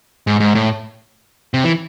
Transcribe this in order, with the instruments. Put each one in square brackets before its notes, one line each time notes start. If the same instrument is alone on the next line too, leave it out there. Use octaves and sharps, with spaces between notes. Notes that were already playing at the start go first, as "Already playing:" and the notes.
[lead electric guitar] G#2
G#2
A2
C3
E3